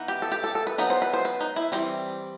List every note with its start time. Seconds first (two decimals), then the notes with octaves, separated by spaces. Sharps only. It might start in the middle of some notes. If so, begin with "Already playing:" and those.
Already playing: E3 B3 D#4
0.08 G4
0.22 A4
0.32 G4
0.44 A4
0.55 A4
0.67 B4
0.78 F#3 B3 D#4 B4
0.90 C5
1.02 B4
1.13 C5
1.25 B4
1.41 D#4
1.56 E4
1.72 E3 G3 C4